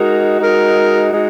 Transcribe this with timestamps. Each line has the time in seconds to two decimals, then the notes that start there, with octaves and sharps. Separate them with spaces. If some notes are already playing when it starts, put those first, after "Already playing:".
Already playing: G#3 D#4 F#4 A#4
0.39 G#3 D#4 F#4 A#4
1.12 G#3 D#4 F#4